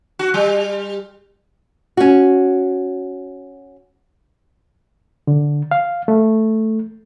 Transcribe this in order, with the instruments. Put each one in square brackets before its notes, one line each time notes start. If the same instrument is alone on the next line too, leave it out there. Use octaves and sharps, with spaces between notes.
[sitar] F#4
G3
[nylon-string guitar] C#4 F#4
[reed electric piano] D3
F5
A3